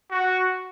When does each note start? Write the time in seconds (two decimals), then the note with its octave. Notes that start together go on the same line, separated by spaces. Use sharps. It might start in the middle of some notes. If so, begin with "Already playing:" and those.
0.11 F#4